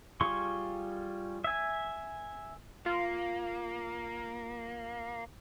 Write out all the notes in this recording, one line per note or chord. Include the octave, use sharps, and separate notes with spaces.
G3 F4 G#4 C6 C#6
E5 G#5
A#3 F4